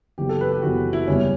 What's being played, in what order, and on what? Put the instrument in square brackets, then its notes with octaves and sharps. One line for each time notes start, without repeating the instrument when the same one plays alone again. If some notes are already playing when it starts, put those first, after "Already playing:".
[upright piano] F#1 F#2 E3 B3 [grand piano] G4
[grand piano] A4
B4
G4
[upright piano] F#1 F#2 E3 B3 [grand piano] F#4
[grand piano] E4
[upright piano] F#1 E2 B2 G3 [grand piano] C#4